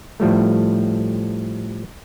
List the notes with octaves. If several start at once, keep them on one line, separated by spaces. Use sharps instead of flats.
A2 F3 G3 A3